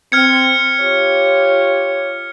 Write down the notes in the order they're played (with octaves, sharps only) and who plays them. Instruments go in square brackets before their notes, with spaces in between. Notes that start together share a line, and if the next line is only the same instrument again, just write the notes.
[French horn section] C4 [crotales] F6 G#6 C#7
[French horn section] F4 G4 C#5